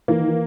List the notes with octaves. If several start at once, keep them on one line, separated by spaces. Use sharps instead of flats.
E3 A#3
D#3
E3